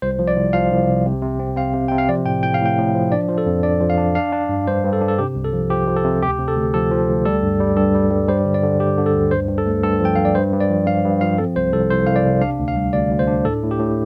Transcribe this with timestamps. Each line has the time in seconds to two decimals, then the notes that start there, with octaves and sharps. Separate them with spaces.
0.02 C2 C5
0.19 F3
0.28 D5
0.36 C2
0.53 F3 F5
0.71 C2
0.88 C3
1.05 C3
1.22 C3
1.39 C4
1.56 C4 F5
1.74 C3
1.88 C3 G5
1.98 F5
2.09 F3 D5
2.25 A2 G5
2.43 A2 G5
2.54 F5
2.61 A2 G5
2.78 A2
2.95 F3
3.12 D4 D5
3.29 F3
3.38 A4
3.46 F2
3.63 D4 D5
3.80 F3
3.90 F5
3.98 D4
4.15 D4 F5
4.32 D4
4.49 G2
4.67 G2 C5
4.84 G2
4.93 A4
5.01 D4
5.08 A4
5.18 C3 G4
5.35 C2
5.44 A4
5.53 F3
5.70 F3 G4
5.87 F3
5.97 A4
6.04 C3
6.22 D2 G4
6.38 C3
6.48 A4
6.56 D2
6.74 F3 A4
6.91 F3
7.08 D2
7.25 G3 A4
7.43 G2
7.60 G3
7.76 G2 A4
7.95 G3
8.11 G2
8.29 G3 C5
8.45 D3
8.54 D5
8.63 D3
8.80 G3 G4
8.98 D3
9.06 A4
9.14 D2
9.31 G2 C5
9.48 G2
9.58 A4
9.66 A3
9.83 G2 A4
10.00 F3 G5
10.16 G2 F5
10.25 D5
10.35 G2 C5
10.53 G2
10.60 D5
10.70 F3
10.87 G2 F5
11.05 G2
11.21 F3 F5
11.38 C4 A4
11.56 C2 C5
11.73 C2 A4
11.90 C2 C5
12.06 C2 F5
12.16 D5
12.24 C3
12.41 D4 F5
12.59 D2
12.68 F5
12.76 G3
12.93 D2 D5
13.11 D2
13.19 C5
13.27 D4
13.45 A2 A4
13.63 A2
13.71 G4
13.80 A2